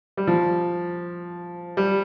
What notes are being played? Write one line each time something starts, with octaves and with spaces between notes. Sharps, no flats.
G3
F3
G3